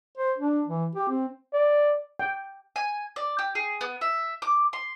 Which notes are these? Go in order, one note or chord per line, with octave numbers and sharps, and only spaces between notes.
C5
D4
E3
G4
C4
D5
G5
G#5
D5
G4
G#4
B3
E5
D6
C6